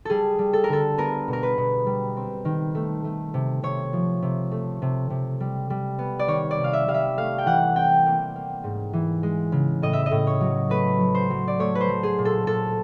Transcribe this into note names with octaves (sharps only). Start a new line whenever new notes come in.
G3 G#4 A4
G3
A4
A#4
D3 A4
B3 A#4
B2
A#4
B4
B2
G3
C4
D#3
A3
A3
C3
C3 C#5
F3
C3
A3
C3
C3
G3
G3
B3
D5
D#3 C#5
D5
C3
F5
E5
G3 F5
E5
A3 F5
G5
E3 F#5
C4 G5
A#3
A#3
G#2
E3
G#3
C#3
A2 D#5
E5
D#5
A2
C#5
F#3
A3 B4
F#3
C5
F#3
D5
A3 C#5
B4
C5
F#3
G#4
A#2
A4
A#2 A4